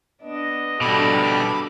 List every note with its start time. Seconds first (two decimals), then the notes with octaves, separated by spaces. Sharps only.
0.22 B3 D4 D#5
0.81 B2 G3 D4 A4 B5 D6